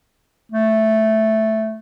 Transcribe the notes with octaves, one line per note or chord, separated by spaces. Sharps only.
A3